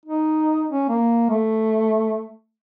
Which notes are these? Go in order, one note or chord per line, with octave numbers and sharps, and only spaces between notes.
D#4
C#4
A#3
A3